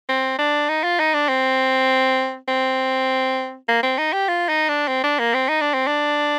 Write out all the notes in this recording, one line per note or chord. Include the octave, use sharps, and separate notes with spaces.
C4
D4
D#4
F4
D#4
D4
C4
C4
A#3
C4
D#4
G4
F4
D#4
D4
C4
D4
A#3
C4
D#4
D4
C4
D4